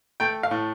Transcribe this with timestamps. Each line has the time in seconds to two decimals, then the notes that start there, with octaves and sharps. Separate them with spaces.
0.20 A3 G5
0.43 F5
0.51 A2